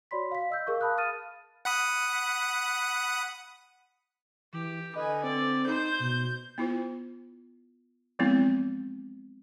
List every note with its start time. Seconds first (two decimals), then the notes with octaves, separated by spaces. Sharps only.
0.11 F#4 C#5 D5 B5 C6 B6
0.31 F5 B6
0.50 D#5 E6 G6
0.67 G#4 A#4 F5 C#6
0.81 F5 A5 B5 D#6 F#6
0.97 A#4 F5 D#6 F6 A6 D#7
1.65 F#5 B5 D#6
4.53 E3 G4
4.95 D3 B4 D#5 G#5
5.24 C4 D5
5.68 D#4 C5 G6
6.00 B2
6.58 B3 E4 F4 C5
8.19 F3 F#3 G#3 B3 C4 E4